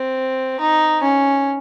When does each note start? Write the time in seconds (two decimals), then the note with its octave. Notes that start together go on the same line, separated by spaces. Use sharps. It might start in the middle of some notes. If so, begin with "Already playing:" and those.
Already playing: C4
0.60 D#4
1.03 C#4